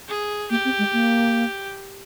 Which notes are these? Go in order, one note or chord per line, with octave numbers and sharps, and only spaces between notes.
G#4
A#3 G4
C4
G#3
A#3